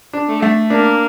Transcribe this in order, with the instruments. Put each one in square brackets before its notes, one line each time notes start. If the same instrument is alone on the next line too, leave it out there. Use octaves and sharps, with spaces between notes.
[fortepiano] D4
[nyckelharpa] A3
[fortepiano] A3
[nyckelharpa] A#3 [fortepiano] D4